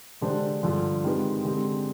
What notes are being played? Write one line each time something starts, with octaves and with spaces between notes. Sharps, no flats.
D3 G#3 D4 G4 C5
G2 D3 F3
D#3 G#3 C4 G4 B4
D3 G#3 C4 G4